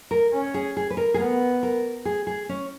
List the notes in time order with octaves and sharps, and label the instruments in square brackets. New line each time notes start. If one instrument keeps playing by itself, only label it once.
[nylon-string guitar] A#4
[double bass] C#4
[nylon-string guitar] G#4
G#4
B4
A#4
G#4
[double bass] B3 [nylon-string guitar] A#4
[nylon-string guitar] A#4
G#4
G#4
C#4